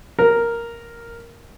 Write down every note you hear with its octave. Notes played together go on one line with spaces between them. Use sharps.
A#4